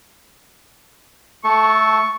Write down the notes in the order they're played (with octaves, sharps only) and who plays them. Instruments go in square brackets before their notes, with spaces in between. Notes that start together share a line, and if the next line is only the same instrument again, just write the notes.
[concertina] A3 A4 [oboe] C#6